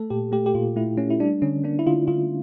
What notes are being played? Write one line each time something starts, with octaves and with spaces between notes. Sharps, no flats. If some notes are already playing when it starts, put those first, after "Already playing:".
Already playing: A3 A4
A#2 G4
A3 G4
G4
A#2 F4
A3 E4
A3 C#4
E4
G3 D4
D3 C#4
A#3 D4
E4
D3 F4
D3 F4